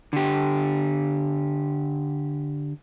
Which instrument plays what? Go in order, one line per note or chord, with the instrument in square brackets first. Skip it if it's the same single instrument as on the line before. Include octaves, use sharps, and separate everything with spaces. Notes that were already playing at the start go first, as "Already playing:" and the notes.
[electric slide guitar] D3 G4